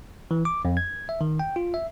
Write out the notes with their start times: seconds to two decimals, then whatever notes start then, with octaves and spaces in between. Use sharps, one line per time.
0.31 E3
0.45 D6
0.65 F2
0.77 G#6
1.09 E5
1.21 D#3
1.39 G5
1.56 F4
1.74 E5